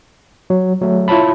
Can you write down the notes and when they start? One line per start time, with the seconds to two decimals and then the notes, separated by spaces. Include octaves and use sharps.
0.50 F#3
0.81 F#3 A3
1.08 E4 F4 C#5 A5 B5